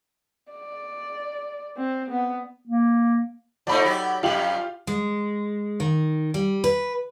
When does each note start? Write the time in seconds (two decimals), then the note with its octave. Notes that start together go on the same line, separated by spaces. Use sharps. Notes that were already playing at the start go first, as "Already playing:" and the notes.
0.52 D5
1.77 C4
2.10 B3
2.68 A#3
3.67 F3 A3 D#4 D5 B5
3.85 F#3 G4
4.23 F2 G3 F4 G4 F#7
4.87 G#3
5.80 D#3
6.34 G3
6.64 B4